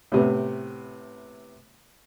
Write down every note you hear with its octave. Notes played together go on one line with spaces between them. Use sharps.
A2 C3 B3